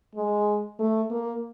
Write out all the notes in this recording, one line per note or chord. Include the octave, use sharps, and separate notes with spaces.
G#3
A3
A#3